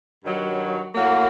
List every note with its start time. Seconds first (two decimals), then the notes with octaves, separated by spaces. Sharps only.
0.24 G2 D#3 F#3
0.95 A2 F#3 A#3